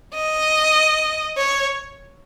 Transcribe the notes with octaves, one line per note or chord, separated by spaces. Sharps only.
D#5
C#5